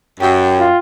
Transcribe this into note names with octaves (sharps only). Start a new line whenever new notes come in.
F#2 G4 G5
F4